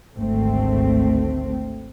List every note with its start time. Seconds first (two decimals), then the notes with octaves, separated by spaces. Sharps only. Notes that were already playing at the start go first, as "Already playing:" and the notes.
0.17 G#1 D2 A3 C4